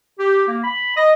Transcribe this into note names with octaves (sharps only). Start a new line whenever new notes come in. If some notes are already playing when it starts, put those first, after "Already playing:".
G4
A#3
B5
D#5